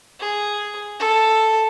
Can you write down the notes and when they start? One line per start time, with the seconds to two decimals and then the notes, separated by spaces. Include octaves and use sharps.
0.20 G#4
0.99 A4